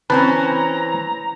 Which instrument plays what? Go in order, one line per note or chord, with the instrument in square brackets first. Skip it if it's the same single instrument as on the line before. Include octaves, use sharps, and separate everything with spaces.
[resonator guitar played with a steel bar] E3 C4 C#4 [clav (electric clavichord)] B4 A5 [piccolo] A#5